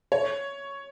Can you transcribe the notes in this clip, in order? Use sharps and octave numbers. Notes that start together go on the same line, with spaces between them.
C#5